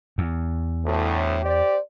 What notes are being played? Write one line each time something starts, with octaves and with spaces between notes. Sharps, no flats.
E2
D2 A2
G4 C5 D5